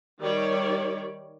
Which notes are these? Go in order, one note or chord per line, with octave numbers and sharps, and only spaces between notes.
D#3 G3 C#5 D5